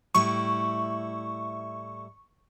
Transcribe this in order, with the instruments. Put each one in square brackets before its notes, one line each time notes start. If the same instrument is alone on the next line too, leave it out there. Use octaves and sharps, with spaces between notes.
[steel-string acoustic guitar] A2 G3 E4 [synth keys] C#6